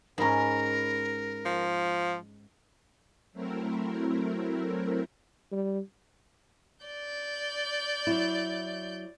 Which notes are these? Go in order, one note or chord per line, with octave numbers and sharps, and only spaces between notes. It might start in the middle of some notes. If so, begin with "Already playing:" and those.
G#2 C#4 A#4 A#5 B5 A#6
F3
F#3 A3 C4 E4 A#4
G3
D5 G6
F#3 E4